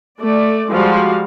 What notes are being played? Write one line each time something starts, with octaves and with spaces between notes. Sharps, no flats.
A3 D5
F3 G3 G#3 F#4 F5